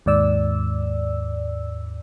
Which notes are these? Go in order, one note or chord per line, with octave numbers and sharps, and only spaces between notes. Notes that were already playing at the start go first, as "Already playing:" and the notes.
D#2 G#2 D5 E6